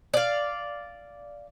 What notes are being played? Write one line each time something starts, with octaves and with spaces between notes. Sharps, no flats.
D5 F5